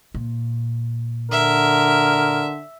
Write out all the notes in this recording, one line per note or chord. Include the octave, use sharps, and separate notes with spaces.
A#2
D3 A#4 E5